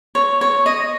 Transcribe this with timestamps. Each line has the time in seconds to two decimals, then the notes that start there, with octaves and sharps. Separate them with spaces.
0.15 C#5
0.41 C#5
0.66 D#5